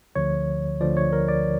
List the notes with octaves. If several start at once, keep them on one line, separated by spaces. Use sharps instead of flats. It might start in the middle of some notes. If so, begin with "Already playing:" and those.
D2 D3 F3 C#5
D2 D3 F3 D5
C#5
A#4
D5